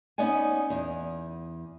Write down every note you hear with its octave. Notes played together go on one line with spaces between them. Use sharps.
B3 C#4 D#4 D5 F#5 G#5
E2